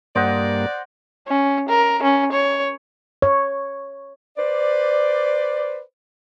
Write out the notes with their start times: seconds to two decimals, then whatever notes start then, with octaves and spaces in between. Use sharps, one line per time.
0.16 G2 A#3 C5 D5 D#5 F#5
1.27 C#4
1.69 A#4
2.03 C#4
2.32 C#5
3.22 C#5
4.37 B4 C5 D5